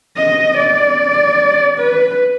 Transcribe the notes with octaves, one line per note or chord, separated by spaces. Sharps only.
D#5
D5
B4